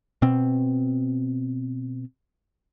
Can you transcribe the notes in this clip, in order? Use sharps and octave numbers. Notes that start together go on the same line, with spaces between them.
B2 C4